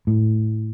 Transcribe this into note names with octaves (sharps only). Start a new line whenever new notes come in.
A2